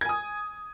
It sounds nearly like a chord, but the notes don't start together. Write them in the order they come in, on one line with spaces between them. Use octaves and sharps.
G#6 G#5 D#6